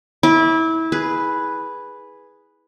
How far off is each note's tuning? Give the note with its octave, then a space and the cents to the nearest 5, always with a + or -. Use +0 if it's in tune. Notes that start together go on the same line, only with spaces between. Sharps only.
E4 -25 D6 +0
G#4 +0 B4 +0